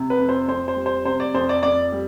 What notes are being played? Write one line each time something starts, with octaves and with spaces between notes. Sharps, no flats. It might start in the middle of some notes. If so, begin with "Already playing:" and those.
Already playing: C3
B4
F2
C5
F2 C5
C5
G3
C5
C3 C5
D5
F2 C5
D5
F2 D5
G3